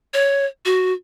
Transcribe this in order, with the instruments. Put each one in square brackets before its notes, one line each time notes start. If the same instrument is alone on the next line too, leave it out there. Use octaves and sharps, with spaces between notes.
[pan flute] C#5
F#4